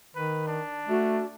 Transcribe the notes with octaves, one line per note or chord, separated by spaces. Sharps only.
D#3 B4
D4
A3 F#4